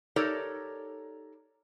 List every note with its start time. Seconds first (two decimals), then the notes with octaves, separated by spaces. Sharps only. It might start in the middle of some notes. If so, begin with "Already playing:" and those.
0.16 D#4 G4 A4 A#4 C#5 D5